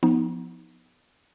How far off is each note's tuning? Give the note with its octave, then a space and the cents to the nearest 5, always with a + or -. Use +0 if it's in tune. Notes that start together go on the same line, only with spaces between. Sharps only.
F3 +0 B3 +0 D#4 +25